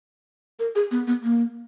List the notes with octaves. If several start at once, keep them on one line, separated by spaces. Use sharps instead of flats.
A#4
G#4
B3
B3
A#3